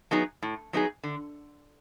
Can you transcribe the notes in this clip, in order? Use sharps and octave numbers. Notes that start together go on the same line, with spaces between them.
F#3 B3 D#4 G#4
A2
F#3 B3 D#4 G#4
D3